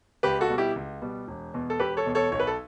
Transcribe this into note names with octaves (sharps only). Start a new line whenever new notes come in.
C#2 G4 B4
F#4 A4
B2 G3
E4 G4
C#2
B2 G3
E1
E2 B2
A4
E1 G4 B4
A4 C#5
E2 B2
A4 C#5
B1 C#5
B4
A4